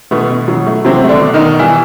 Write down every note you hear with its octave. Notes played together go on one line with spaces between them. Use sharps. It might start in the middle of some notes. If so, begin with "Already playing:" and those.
B2 A3 B3
B2
F#3
A3
C3 F#3 C4
A3
D3 D4
B2
D#3 D#4
B2
E3 G3 E4